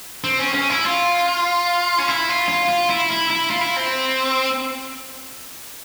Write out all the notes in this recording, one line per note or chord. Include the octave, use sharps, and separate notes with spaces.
C4
C#4
C#4
E4
F4
C#4
E4
F4
F4
F4
E4
E4
E4
F4
E4
C4